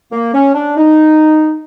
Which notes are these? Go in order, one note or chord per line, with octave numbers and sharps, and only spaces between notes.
A#3
C#4
D4
D#4